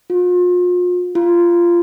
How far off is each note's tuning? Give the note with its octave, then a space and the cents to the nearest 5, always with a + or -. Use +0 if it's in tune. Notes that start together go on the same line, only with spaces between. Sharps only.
F4 +40
F4 -15